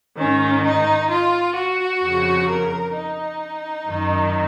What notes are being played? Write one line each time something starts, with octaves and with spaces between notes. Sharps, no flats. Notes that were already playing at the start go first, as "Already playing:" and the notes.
G#2 D#3 C#4
D#4
F4
F#4
F2 C#3
A#4
D#4
F#2 D#3